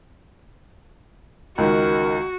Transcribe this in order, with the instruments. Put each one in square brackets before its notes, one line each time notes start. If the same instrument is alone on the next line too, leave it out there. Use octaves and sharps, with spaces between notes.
[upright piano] C#2 D#3 [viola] F#4 [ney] A#4